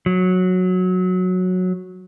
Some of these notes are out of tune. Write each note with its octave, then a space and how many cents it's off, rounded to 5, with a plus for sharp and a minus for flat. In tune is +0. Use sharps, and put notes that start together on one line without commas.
F#3 -10